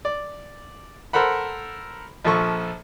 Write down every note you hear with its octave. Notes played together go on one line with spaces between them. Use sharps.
D5
A4 A#4 C5 F#5 B5
A#1 F3 A4 C#6